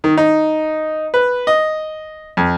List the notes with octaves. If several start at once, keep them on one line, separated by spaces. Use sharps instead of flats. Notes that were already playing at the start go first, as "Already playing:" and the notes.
D#3
D#4
B4
D#5
F2